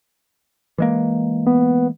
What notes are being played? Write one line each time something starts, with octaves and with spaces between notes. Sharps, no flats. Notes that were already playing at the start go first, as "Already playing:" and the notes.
E3 G#3 A#3
B3